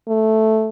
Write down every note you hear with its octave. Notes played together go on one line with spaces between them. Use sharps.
A3